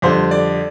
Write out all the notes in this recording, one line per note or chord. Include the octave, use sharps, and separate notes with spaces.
F2 D3 G3 C5
D5